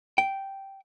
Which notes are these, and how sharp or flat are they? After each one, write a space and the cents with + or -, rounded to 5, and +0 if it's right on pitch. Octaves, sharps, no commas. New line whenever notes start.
G5 -10